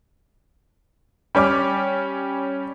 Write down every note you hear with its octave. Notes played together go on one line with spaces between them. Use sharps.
G3 C#4 D6 F6